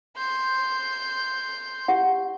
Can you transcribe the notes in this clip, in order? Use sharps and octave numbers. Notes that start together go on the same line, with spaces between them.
C6 G6
G4 F#5